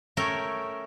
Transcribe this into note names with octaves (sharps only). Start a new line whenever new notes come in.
A3 C#4 A4 A#4 C#5 G5